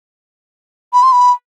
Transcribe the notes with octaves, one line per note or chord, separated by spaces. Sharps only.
B5
C6
B5